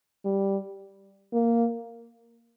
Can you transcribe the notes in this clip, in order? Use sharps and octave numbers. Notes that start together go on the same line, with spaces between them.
G3
A#3